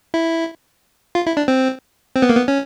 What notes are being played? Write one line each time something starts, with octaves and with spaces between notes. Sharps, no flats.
E4
F4
E4
D4
C4
C4
B3
A#3
B3
C#4